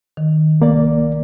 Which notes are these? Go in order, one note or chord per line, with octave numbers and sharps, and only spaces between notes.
D#3
C2 A#3 D5